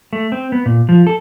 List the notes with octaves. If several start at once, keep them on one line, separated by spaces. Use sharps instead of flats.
A3
C4
B3
A#2
F3
A4